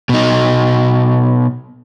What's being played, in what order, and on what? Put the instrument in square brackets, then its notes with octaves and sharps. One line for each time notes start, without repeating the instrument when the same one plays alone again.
[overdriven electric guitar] B2 D#4